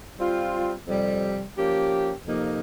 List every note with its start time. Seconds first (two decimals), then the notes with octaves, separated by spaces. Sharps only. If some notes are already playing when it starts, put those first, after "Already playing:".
0.18 G3 C4 F4
0.87 F2 C3 G3
1.57 F3 A#3 C#4 G4
2.26 F2 C3 F3 A#3 D#4